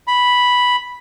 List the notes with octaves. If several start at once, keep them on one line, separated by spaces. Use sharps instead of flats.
B5